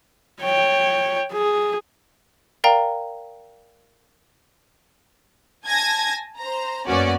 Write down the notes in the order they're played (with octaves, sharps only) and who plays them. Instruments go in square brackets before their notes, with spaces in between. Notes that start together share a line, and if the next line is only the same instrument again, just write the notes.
[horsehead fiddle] C#5 G5
G#4
[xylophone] A#4 D5 F5 G5 A#5
[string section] G#5 A5 G#6 A#6
C5 A#5
F#2 A#3 B3 C#4 F#4 D5